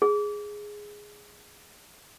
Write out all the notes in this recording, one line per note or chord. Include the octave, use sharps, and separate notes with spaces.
G#4